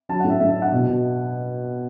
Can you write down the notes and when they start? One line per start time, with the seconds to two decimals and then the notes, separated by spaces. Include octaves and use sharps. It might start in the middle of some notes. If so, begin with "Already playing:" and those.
0.09 F#3 A5
0.20 A2 F#5
0.30 E5
0.40 A2 E5
0.50 E5
0.56 D4
0.62 F#5
0.72 B2
0.87 B2